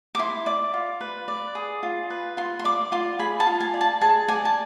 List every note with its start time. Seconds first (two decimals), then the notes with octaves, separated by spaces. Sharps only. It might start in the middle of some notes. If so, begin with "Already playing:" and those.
0.15 D6
0.19 E4 C6
0.46 D5 D6
0.74 F4
1.01 B4
1.28 D5
1.55 G#4
1.83 F4
2.10 B4
2.37 F4 C6
2.59 C6
2.64 D5 D6
2.92 F4 C6
3.19 G#4 B5
3.40 A5
3.47 F4
3.60 G#5
3.74 D5
3.81 A5
4.01 G#4 A5
4.28 D5 G#5
4.45 A5